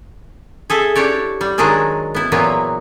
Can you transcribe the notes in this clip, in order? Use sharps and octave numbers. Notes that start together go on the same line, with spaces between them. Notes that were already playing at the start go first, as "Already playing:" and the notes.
G#4 A4 E5
D4 E4 G4 C#5 D5
G3
D#3 F#3 G#3 D4 F#4 G#4
B3 E4
A#2 E3 F#3 A#3 B3